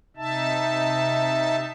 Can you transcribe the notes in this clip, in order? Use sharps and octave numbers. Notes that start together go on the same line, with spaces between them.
C3 D#4 E5 A5